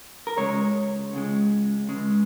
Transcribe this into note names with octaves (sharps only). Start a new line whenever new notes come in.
A#4
C#2 C#3 G#3 C#5
C#2 C#3 G#3
C#2 C#3 G#3